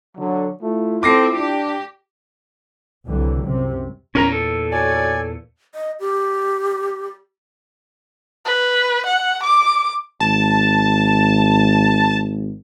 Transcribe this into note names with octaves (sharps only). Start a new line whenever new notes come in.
D3 F#3
A3 E4 F4
C4 A4 D6 A#6 C7
D4 G4
C2 D3 E3 F#3 G3
C2 F#2 C3
E2 A#2 C#4 A#4 A#5
A4
F#4 C#5 D5 G#5
D#5
G4
B4
F#5
D6
G#1 A5